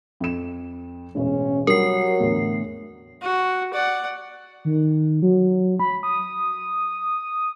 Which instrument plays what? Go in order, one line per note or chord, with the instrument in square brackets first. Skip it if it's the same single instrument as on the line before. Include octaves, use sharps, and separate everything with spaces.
[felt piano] F2 E7
[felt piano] E1 A1 G#3 [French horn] C#4
[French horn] F#3 [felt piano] G3 [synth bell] A#4 C7
[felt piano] E2 A2 D3
[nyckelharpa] F#4
D5 F#5
[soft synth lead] D#3
F#3
B5
D#6